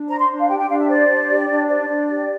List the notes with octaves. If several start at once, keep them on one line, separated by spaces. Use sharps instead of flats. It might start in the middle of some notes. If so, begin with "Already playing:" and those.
Already playing: D4
C5 A#5
C6
D4
F5
G4 G5
G5
D4 F5
E5
C5 D5
D4
G4
D4
C5 D5
D4
G4